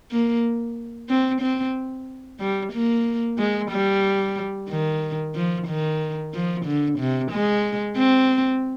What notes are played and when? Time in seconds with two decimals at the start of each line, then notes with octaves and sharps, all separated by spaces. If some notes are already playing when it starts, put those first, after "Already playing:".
0.11 A#3
1.09 C4
1.41 C4
2.39 G3
2.73 A#3
3.38 G#3
3.71 G3
4.69 D#3
5.35 F3
5.67 D#3
6.34 F3
6.65 D3
6.99 C3
7.31 G#3
7.97 C4